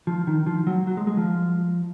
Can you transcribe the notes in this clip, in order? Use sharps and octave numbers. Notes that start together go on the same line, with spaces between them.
F3
D#3
F3
F#3
F#3
G#3
G#3
F3